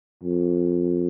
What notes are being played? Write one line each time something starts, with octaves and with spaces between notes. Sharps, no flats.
F2